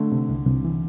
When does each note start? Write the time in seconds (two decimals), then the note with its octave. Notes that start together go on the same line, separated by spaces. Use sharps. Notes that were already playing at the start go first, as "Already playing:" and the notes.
Already playing: D3 A3
0.12 C3
0.29 C2
0.46 C2
0.65 E3